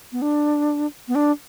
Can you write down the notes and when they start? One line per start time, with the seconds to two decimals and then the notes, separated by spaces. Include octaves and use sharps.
0.12 B3
0.22 D4
1.08 B3
1.15 D4